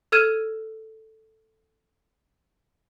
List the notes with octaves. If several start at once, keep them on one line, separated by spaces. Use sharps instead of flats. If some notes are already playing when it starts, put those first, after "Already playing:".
A4 E6 F6 G#6 D#7 E7